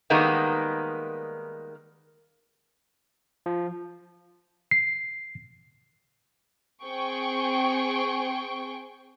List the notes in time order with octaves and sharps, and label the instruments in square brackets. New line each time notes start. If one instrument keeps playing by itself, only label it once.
[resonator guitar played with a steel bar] D#3 G3 G#3 A#3 B3
[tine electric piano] F3
C7
[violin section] C4 G#4 G5 C#6 D7